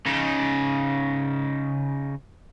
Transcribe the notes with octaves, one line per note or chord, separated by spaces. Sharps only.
C#3 D#4